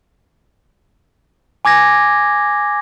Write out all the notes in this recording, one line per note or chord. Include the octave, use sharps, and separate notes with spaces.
G#5 D6 G#6 A#6